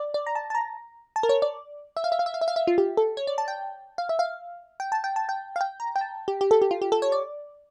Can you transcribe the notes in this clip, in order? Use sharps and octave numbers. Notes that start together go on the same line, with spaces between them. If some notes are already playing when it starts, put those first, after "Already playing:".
Already playing: D5
D5
A#5
A5
A5
A#5
A5
A#4
C#5
D5
E5
F5
E5
F5
E5
F5
E5
F5
E5
F4
G4
A4
C#5
D5
A5
G5
F5
E5
F5
G5
A5
G5
A5
G5
F5
G5
A#5
G5
A5
G4
G4
A4
G4
F4
G4
A4
C#5
D5